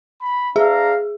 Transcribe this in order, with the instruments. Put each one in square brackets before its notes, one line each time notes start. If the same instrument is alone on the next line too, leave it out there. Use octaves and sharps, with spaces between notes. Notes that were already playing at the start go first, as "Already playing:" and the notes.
[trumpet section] B5
[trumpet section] D4 F5 A#5 [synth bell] G#4 [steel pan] E5